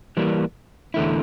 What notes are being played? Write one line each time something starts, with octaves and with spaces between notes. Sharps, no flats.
E3 G3 A#3
E2 D3 A3 E4